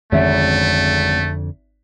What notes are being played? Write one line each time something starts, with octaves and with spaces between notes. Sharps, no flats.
G#1 F2 D3 A3 C#4 E5